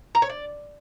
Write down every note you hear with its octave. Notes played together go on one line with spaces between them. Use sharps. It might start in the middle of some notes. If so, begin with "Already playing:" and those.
A#5
C#5
D5